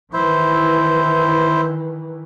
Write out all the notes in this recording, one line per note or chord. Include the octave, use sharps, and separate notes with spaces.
D#3 E3 E4 C5